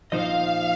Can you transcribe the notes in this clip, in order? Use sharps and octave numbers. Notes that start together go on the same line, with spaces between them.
A#2 F3 D#4 C5 D#5 F5